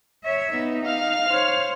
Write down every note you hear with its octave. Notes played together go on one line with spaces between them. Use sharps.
C#5 E5
B3 D#4
F5 F6
C5 C#5